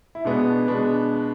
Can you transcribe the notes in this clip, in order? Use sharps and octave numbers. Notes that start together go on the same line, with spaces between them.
E4
B2 G#3 B3 D4
D4
B2 G#3 B3 D4